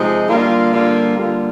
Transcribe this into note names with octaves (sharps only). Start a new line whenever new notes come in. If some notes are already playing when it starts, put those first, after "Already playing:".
Already playing: C3 F3 G#3 D#4
D3 G3 A#3 F4
D3 G3 A#3 F4
D3 G3 A#3 F4